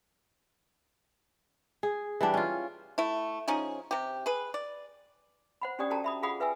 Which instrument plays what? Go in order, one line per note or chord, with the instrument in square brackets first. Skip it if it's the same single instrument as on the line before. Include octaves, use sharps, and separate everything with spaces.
[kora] G#4
E3 G3 D4
C#4 F4
[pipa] A3 E4
F3 C#4 D#4 G#4
C3 G4
G#4 B4
D5
[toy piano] C5 F#5 B5
C#4 D4 G4 D5 G5 D#6
C#4 F#4 A4 G5 A5 A#5
E5 B5 D#6
F4 G#4 F5 F#5 B5 D#6
B4 E5 G5 G#5 E6